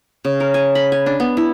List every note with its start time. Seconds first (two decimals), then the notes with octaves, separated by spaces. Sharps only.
0.25 C#3
0.40 A#4
0.54 G#5
0.75 B5
0.92 G#5
1.06 D4
1.20 B3
1.37 E4